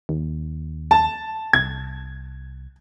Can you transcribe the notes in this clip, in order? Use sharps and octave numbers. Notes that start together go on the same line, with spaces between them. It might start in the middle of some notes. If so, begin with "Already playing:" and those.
D#2
A5
C2 G#6